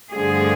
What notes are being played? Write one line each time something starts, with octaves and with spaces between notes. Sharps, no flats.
G2 D3 F3 A3 G#4